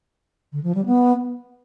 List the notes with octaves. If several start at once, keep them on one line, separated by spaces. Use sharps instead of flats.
D3
F3
G3
B3